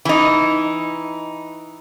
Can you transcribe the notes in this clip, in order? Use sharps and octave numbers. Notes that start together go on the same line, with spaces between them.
E3 D#4